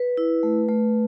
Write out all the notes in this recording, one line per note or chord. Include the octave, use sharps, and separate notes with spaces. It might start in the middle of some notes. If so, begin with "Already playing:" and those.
Already playing: B4
E4
A3
A3